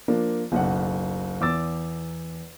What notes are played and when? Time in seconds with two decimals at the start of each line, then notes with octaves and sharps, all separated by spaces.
0.08 F3 A#3 D4
0.52 F#1 B1 F#5
1.41 E2 D6 E6 A6